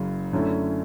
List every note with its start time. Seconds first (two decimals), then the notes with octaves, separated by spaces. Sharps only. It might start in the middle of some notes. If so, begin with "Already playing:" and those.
Already playing: F#1 F#2 C#3
0.33 F#2 D3 A3 C#4 E4